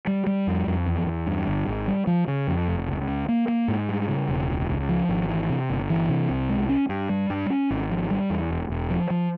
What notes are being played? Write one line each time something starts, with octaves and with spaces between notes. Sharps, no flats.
G3
G3
F2
F2
E2
E2
G2
G1
G#1
G3
F3
C#3
F2
F1
C#2
C#3
A#3
A#3
G#2
G3
C#3
E1
C#2
C#2
F3
G#1
E3
C3
G1
E3
C3
C2
G#3
C#4
G2
G3
G2
C#4
G#1
F3
G3
E2
E1
E1
F3
F3